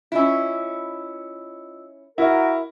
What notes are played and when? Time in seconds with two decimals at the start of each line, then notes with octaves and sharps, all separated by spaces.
0.12 C#4 E4 F4 D#5 E6
2.18 E4 F#4 A#4